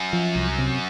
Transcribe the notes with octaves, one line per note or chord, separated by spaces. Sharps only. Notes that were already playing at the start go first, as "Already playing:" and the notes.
Already playing: F#2
F3
C2
C3